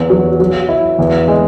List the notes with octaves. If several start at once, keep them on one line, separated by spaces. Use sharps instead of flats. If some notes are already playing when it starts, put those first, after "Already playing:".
Already playing: E2
F#3
F#3
E4
E2
G#3